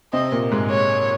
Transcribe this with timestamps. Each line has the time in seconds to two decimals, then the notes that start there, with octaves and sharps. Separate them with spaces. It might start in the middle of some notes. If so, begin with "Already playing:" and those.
0.13 C3 C4 D#5
0.32 A#2 A#3
0.51 G#2 G#3
0.71 C#5